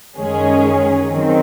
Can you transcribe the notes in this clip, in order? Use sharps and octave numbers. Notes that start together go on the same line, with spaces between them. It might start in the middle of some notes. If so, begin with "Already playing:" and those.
F#2 D#3 G#3 C#4 G#4
D#3 F#3 C4